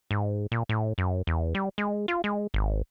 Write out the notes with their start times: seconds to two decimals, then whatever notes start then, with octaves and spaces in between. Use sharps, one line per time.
0.11 G#2
0.52 A#2
0.69 A2
0.98 F#2
1.27 E2
1.55 G3
1.78 G#3
2.08 F4
2.24 G#3
2.54 G#1